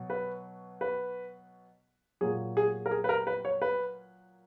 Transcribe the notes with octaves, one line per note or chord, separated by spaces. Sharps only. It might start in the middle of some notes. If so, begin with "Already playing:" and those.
Already playing: B2 F#3
B4
B4
A#2 F#3 G#4
G#4
A#4
G#4
B4
A#4
B4
C#5
B4